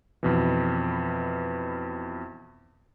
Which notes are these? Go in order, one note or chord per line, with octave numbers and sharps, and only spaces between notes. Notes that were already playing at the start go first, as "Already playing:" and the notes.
F2 B2 E3